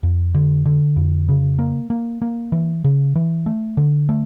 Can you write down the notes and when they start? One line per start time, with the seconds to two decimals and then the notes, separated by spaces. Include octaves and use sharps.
0.03 F2
0.35 D3
0.66 D3
0.96 F2
1.29 C#3
1.59 A#3
1.90 A#3
2.22 A#3
2.52 E3
2.84 C#3
3.15 E3
3.46 A3
3.77 D3
4.09 A3